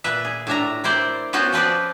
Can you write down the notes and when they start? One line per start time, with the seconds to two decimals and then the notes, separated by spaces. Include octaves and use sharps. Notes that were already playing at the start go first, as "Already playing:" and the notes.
0.04 A#2 B4 E5
0.25 G#4
0.47 A2 D4 E5 A#5
0.84 C4 E4 A#4 C5 D5
1.33 B3 C#4 F4 F#4 C5
1.53 F3 C4 B4 C5 D5